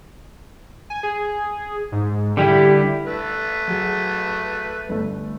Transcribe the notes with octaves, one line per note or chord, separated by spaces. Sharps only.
G#5
G#4
G#2
D3 G3 E4 G4
A3 B4
F#3 G#4
G1 A3